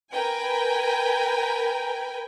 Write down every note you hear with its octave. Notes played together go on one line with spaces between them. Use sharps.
A#4 B4 G5 G#5